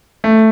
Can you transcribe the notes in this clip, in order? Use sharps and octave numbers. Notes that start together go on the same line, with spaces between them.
A3